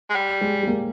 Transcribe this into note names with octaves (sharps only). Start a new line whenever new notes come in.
G#3
G3
G#3
G#3
A#3